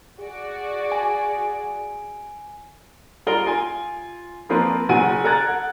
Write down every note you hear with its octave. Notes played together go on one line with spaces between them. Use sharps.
F#4 G#4 D5
G#5
G3 F4 A#4 G7
F4 G#5
F3 A#3 C4 F4 A#4 B4
F#1 F#3 F#5 G#5 D#7
A4 A#4 A#5 F#6 G#6 A6
F#5